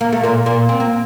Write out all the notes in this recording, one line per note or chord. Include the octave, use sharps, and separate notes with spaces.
A#3
A3
A#2 A#3
A#2 A#3
C4
A#3